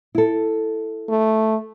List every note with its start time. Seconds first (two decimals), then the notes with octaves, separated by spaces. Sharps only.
0.15 E4 A4
1.09 A3